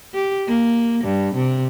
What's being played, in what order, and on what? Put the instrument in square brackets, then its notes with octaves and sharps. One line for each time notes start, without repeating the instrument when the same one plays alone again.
[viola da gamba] G4
A#3
G2
C3